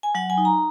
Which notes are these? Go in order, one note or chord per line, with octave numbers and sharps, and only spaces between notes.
G#5
F#3 F#5
G#5
D#4
A#5